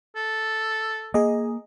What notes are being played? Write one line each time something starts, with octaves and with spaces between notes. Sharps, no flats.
A4
A#3 G#4 D#5